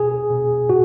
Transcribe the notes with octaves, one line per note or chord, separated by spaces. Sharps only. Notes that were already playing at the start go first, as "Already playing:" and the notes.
Already playing: B2 G#4
B2
A2 F#4